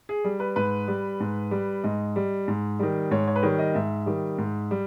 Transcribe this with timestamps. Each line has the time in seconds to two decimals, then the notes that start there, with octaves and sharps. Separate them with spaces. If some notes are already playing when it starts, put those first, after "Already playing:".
0.09 G#4
0.24 G3
0.40 B4
0.56 G#2 B4
0.88 G3
1.20 G#2
1.51 G3
1.84 G#2 D#5
2.16 G3
2.48 G#2
2.79 D#3 G3
3.11 G#2 C#5
3.27 C#5
3.36 B4
3.43 D#3 G3 C#5
3.59 D#5
3.74 G#2 E5
4.06 D#3 G3
4.38 G#2
4.71 G3